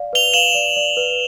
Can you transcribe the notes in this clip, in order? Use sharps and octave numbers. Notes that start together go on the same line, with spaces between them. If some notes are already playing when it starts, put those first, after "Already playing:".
Already playing: D5 F5
B4 F7 G7
F5 E7 F#7
D5
D5
B4